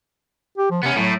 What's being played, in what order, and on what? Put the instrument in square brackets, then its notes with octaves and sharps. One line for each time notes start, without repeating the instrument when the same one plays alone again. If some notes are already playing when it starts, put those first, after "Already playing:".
[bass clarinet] G4
F3
[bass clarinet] C3 [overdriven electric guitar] B3 C#4
[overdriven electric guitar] A2 [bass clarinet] F#3